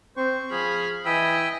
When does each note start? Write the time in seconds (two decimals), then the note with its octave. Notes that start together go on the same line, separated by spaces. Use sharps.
0.17 C4 C5 C#6
0.52 F3 G#4 B5 F6
1.05 E3 D#5 G5 G#5 B5 E6